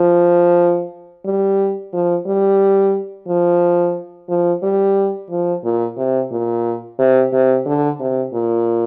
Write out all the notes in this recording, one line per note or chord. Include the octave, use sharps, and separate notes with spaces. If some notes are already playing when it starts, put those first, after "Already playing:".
Already playing: F3
G3
F3
G3
F3
F3
G3
F3
A#2
C3
A#2
C3
C3
D3
C3
A#2